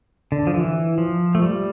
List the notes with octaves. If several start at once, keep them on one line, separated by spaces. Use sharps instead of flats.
D3
F3
E3
F3
A3
G3